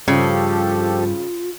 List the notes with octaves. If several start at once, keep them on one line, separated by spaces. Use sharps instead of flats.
G2 C#3 F3 F4 G4 A4